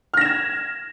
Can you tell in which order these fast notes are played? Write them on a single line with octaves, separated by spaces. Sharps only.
F6 A#6 E7 G#6